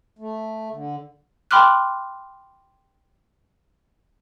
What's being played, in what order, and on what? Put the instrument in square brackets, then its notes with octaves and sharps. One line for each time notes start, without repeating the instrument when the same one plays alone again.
[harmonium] A3
D3
[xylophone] G5 B5 C6 D6 F6 F#6